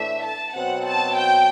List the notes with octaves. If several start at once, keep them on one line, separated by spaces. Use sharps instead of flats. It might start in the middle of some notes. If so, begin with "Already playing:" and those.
Already playing: A2 E3 A3 D4 A4 E5
A5
B2 F#3 C4 F#5
A5
G5